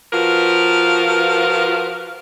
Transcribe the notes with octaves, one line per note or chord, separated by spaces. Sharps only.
F3 F4 F#4 A#4 B4